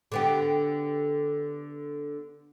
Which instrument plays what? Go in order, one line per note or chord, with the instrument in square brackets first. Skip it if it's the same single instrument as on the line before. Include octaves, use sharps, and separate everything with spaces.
[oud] D3 B3 G4